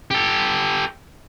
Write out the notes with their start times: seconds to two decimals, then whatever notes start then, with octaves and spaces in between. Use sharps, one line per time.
0.11 G4 A4